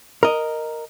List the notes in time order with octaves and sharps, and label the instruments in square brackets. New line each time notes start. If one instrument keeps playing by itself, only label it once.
[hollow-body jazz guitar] A#4 D#5